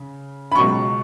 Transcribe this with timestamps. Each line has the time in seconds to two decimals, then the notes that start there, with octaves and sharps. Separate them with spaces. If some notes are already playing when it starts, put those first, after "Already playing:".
Already playing: C#3
0.52 B5
0.55 C#2 B2 F#3 C#6